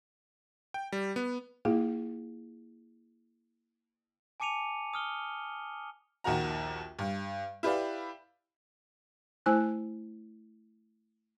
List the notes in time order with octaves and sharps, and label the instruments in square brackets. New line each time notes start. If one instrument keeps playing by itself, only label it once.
[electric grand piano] G5
G3
B3
[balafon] A#3 E4 F4 G#4 F5
[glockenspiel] G#5 A5 D6 C#7 D#7 F7
D#6 F6 G7
[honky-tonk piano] A#1 D#2 D#3 F#4 A#5
G2
E4 G4 B4 D5 F5
[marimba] A3 E4 C5 G#5 F#6